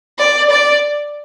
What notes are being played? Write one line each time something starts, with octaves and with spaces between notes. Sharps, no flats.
D5
D5